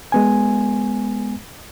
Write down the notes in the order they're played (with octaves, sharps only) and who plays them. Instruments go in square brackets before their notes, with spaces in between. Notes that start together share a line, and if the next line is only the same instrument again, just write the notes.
[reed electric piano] G#3 B3 G#5